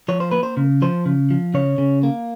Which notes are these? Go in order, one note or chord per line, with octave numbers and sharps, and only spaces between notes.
F3 C#5
C5
A#3 B4
C5
C#3
F3 C5
C#3
F3
C#3 C#5
C#3
A#3